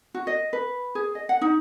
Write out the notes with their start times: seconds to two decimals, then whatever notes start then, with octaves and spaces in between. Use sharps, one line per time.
0.14 F#4
0.27 D#5
0.53 B4
0.95 G#4
1.15 D#5
1.29 F#5
1.41 D#4